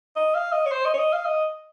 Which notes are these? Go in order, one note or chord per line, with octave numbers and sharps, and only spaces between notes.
D#5
F5
D#5
C#5
C5
D#5
C#5
D#5
F5
D#5